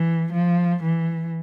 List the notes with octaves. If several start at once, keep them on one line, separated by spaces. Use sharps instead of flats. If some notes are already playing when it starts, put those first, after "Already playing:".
Already playing: E3
F3
E3